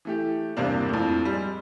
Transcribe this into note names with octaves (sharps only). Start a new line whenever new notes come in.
E3 A3 G4
E2 G2 C3 A#3 D4
F2 A2
G3 G#3